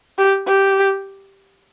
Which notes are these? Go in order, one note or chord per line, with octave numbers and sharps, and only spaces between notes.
G4
G4